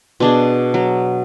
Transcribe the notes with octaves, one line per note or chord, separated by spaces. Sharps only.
B2 D4 G#4
F#3